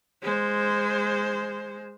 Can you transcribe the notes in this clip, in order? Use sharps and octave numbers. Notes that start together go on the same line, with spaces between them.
G#3 C5